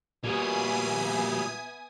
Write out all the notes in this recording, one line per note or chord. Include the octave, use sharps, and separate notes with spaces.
A#2 G3 B3 F#4 E5 G#5 D#6